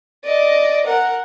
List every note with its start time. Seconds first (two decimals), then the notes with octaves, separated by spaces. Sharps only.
0.24 D5 D#5
0.86 A#4 F#5